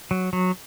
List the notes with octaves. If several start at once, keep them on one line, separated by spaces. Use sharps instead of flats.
F#3
F#3